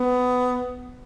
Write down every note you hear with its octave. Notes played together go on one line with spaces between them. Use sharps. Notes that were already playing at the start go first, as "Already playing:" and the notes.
Already playing: B3